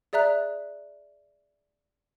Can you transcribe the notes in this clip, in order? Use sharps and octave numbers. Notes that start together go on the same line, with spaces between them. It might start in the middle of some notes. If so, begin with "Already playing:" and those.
G#4 D5 E5 A#5 F#6